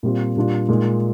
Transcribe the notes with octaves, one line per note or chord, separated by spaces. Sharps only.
A#2 G3 C4 F4
A#2 G3 D4 F4
A#2 G#3 D#4